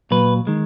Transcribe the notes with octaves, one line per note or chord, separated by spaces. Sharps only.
A#2 F#3 B4
D#3 G#3